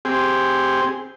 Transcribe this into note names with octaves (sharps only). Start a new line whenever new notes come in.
C4 G4 G#4